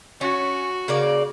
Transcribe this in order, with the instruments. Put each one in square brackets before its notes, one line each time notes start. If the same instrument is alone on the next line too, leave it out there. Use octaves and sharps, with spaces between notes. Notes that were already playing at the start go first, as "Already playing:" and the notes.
[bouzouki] C#4 [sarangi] F#4
[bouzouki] C#3 A#3 D5